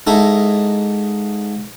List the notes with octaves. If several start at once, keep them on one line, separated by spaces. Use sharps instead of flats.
G#2 D#4 E4 A4